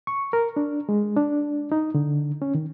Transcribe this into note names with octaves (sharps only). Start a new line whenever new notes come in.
C#6
A#4
D4
G#3
D4
D#4
D3
C#4
D#3